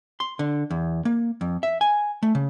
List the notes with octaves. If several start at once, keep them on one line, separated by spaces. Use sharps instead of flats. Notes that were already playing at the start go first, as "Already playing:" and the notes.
C6
D3
E2
A#3
F2
E5
G#5
A3
C#3